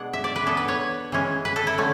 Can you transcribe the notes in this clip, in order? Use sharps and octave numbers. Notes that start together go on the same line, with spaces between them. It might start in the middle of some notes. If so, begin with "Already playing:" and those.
Already playing: B2 G#3 D4 F#5
E5
D5
B4
E3 B3 D4 A4
B4
C#5
E3 G#3 C#4
B4
A4
E4
D3 A3 C#4